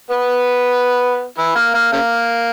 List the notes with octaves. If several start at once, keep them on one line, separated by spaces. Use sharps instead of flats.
B3 B4
E3 E4
A#3
A#3
C#3 A#3